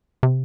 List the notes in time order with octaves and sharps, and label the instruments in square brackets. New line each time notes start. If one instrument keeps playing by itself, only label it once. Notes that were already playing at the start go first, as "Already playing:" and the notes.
[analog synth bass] C3